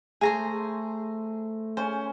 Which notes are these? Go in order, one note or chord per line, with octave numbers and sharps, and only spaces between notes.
A3 G#4 C5 A#5 C6
C#4 C5 G#5